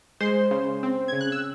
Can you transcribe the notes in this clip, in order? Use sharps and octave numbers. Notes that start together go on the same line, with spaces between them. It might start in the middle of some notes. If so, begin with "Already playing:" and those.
G#3 C5 C6
C#3
C4
C#3 G#6
F#6
E6